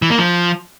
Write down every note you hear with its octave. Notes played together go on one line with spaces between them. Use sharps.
E3
A#3
F3